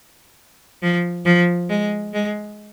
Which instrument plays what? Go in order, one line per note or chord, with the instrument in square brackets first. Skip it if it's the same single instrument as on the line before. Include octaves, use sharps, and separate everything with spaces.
[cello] F3
F3
G#3
G#3